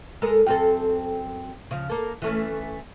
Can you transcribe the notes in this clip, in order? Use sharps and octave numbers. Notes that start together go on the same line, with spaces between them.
G#3 A4 A#4
F#2 C4 A4
C#3 F3
A#3 A4
E3 A3 C#4